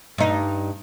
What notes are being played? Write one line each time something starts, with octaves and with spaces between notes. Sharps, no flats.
G2 D#4